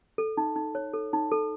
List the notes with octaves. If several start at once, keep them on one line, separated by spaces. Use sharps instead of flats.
A4
D#4
D#4
C#5
A4
D#4
A4